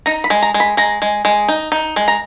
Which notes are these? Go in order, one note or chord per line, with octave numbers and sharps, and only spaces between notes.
D#4 A#5
B5
G#3
A#5
G#3
B5
G#3 A#5
G#3
G#3
D#4
D#4
G#3
A#5